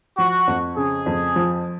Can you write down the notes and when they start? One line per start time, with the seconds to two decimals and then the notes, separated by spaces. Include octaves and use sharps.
0.18 F3 F#4
0.47 F2
0.77 C#3 G#4
1.06 F2
1.36 F3